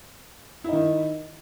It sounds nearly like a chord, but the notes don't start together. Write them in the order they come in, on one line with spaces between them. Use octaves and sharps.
E4 D#4 D#3